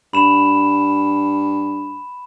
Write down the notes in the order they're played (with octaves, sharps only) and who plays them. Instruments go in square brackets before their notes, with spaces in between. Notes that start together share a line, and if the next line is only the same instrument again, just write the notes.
[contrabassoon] G2 [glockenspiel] B5 E7